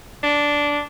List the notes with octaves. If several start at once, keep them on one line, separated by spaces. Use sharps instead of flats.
D4